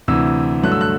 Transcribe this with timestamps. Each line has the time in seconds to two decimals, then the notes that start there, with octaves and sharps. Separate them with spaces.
0.08 D2 C3 E3 E6
0.63 G2 D3 F#3 A3 F#6
0.72 E6
0.81 F#6